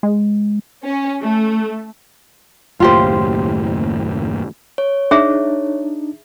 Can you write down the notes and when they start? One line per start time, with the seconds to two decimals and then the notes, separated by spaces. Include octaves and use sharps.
0.03 G#3
0.85 C#4
1.22 A3
2.80 F#1 D#2 A2 F4 G4 C5
4.78 C#5
5.11 D4 D#4 G#4 E5